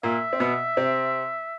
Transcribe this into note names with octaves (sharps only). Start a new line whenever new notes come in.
A#2 A#3 E5
C4
B2 B3
C3 C4